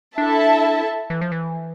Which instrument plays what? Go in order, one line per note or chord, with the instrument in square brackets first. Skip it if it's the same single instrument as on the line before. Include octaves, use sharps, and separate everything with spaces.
[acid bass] D4 [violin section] E4 A4 E5 A5
[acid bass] E3
F3
E3